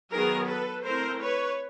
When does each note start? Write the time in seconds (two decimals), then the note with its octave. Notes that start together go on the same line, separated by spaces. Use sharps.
0.12 D#3 F#3 B3 G#4 A#4
0.48 A4 B4
0.85 A3 C4 E4 A#4 C5
1.22 B4 C#5